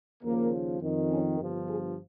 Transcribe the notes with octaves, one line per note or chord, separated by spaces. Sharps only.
D#2 C#3 F3 A#3
F2 D#3
C#4
G1 G2 F3
G#4